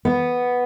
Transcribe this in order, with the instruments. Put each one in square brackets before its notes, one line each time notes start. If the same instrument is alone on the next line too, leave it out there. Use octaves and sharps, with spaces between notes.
[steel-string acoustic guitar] B3